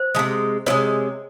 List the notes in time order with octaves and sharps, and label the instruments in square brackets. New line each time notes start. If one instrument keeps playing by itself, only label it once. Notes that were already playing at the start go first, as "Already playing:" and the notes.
Already playing: [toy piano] C5
[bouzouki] F3 G#3
C3
[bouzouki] C3 F3 G#3 [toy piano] C#5